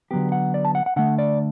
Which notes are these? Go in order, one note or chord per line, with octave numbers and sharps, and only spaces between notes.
D3 F#3 B3 G4
F#5
D5
A5
F#5
F#5
D3 A3 F#5
D5